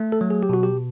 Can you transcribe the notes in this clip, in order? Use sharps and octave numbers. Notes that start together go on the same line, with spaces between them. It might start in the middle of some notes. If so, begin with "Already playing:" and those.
Already playing: A3
A4
F#3
G#4
G4
B2 F#4
G4